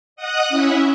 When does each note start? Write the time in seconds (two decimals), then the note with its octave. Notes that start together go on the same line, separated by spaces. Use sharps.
0.16 D#5 F#5 D#6 F#6
0.49 C#4 E4 E5